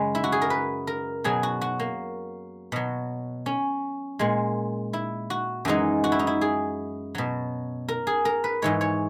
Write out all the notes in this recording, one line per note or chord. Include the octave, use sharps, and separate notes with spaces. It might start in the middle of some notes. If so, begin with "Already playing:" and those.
Already playing: F#2 C#3 G#3 B4
E4
F#4
G#4
A#4
B4
A#4
B2 F#3 G#4
F#4
F#4
A#3
B2 F#3
C#4
A#2 G#3
E4
F#4
F#2 E3 G#3 D#4
F#4
E4
D#4
E4
G#4
B2 F#3
A#4
G#4
A#4
B4
G#2 E3 G#3 C#5
C#5